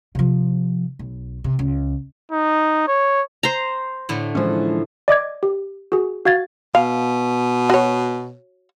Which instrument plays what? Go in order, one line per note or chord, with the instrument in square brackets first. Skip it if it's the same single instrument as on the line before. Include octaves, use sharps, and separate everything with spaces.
[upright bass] C3 F3
B1
C3
C#2
[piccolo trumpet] D#4
C#5
[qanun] C5 A#5
[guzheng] A2 D3 A3
[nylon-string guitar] E3 F3 [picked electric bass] G#3 C#4
[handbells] D5 D#5 D6 G#6
G4
F#4 G#4
F#4 F5 G#6 A6
[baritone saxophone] B2 [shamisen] F5
[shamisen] F#4 C#5